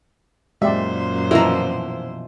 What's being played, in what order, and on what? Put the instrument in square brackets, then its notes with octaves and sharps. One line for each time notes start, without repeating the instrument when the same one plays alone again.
[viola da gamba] F#2 A#2 C5 [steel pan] G#3 G4 D5 [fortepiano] E5
[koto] B2 E3 F3 [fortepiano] E4 A#5 [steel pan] F4 A#4